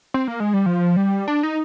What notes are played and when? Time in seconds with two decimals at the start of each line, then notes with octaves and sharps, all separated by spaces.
0.14 C4
0.28 A#3
0.40 G#3
0.54 G3
0.66 F3
0.96 G3
1.28 D4
1.43 D#4